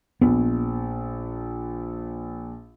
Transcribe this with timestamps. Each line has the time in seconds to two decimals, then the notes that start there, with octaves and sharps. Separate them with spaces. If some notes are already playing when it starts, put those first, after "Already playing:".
0.21 A#1 B3